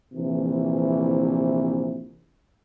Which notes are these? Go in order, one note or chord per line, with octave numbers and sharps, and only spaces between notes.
A#1 C3 E3